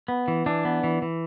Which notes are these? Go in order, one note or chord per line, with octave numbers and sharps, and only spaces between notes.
B3
E3
E3 D4
B3
E3
E3